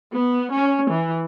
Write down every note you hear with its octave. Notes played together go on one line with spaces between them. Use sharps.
B3
C#4
E3